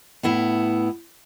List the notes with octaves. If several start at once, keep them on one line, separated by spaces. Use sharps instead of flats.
A2 B3 E4